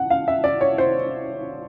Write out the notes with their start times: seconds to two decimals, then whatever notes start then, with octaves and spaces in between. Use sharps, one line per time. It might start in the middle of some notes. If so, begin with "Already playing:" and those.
Already playing: F#5
0.10 F5
0.28 E5
0.44 D5
0.61 C#5
0.78 C5